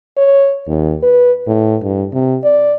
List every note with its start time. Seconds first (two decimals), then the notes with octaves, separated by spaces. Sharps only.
0.17 C#5
0.67 D#2
1.02 B4
1.46 A2
1.82 G2
2.13 C3
2.44 D5